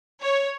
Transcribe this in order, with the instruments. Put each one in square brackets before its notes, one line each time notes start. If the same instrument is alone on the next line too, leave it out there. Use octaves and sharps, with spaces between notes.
[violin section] C#5